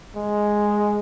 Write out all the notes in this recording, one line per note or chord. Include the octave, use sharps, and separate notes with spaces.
G#3